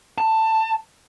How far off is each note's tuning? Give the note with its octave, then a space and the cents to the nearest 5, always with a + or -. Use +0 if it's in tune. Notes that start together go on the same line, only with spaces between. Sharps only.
A5 +10